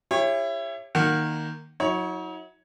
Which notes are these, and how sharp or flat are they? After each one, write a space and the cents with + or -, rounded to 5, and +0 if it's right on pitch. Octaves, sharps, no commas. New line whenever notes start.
E4 +25 G4 +30 C#5 -20
D#3 -10 A#3 +0 F#5 +0
F#3 -20 D#4 +45 C#5 +0